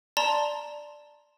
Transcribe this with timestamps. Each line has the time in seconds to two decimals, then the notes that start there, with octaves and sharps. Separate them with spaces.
0.17 D5 A5 A#5 C6